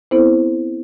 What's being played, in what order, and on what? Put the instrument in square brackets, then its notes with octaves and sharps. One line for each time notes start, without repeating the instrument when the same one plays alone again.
[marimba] B3 C4 E4 A4 C5